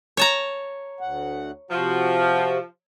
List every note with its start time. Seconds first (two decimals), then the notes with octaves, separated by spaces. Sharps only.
0.17 C#5 A5 A#5
1.01 D2 F#5
1.71 C3 F3 F#4